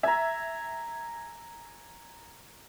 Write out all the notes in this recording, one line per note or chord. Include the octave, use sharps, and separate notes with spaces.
E5 G#5 A#5